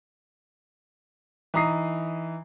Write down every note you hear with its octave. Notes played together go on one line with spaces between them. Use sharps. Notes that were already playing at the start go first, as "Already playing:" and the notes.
E3 D#4 A#5 D#6 C7